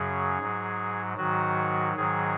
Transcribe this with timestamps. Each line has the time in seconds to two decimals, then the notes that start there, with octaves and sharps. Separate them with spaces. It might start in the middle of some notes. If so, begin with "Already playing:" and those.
Already playing: F#2 C#3 F#3 G#4
0.39 G#2 F#3
1.17 G#2 D#3 F#3 F#4
1.97 G#2 D#3 F#3 G#4